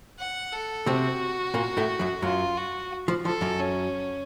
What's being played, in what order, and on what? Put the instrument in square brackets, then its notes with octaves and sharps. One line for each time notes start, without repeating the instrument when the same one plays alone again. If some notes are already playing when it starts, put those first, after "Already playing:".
[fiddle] F#5
A4
[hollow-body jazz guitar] C3 C4 [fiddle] F#4
[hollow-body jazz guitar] A#2 A#3
A2 A3
F#2 F#3
[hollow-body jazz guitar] F#2 F#3 [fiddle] F4
[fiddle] F#4
[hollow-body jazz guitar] F3
[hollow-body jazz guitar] F3 [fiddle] A4
[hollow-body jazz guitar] F#2 F#3
[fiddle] C#4